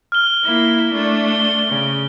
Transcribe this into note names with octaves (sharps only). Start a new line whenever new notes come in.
F6 G7
A#3 E4
A3 D4
G7
C#3